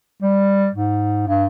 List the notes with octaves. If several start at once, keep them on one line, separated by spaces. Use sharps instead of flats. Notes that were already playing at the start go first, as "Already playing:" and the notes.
G3
G#2
G2